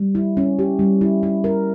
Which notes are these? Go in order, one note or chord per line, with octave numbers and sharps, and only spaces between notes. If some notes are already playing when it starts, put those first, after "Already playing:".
Already playing: G3
E4
C#4
G4
G3
E4
E4
A#4